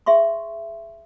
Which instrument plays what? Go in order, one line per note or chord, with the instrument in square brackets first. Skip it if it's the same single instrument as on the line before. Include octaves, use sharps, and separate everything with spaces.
[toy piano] G#4 E5 C6 C#6